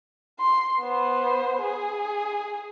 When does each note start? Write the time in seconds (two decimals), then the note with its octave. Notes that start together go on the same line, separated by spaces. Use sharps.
0.40 C6
0.81 B3 C5
1.61 G#4